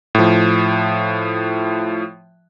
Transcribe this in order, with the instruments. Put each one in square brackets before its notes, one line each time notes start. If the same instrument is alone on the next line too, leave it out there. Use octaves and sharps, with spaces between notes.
[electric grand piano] A2 F3